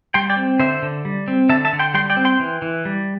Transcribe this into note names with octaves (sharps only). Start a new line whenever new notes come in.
G3 G5 C6
D5 G5
C4
D3 C5 E5
D3
G3
C4
D3 E5 A5
E5 A5
D3
G5 C6
G3 G5 C6
D5 G5
C4
G5 C6
E3
E3
G3